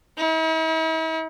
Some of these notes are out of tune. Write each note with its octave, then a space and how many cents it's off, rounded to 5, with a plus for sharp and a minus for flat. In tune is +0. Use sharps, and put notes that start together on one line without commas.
E4 -45